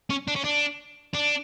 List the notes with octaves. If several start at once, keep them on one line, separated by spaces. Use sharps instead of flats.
C#4
D4
C#4
D4
D4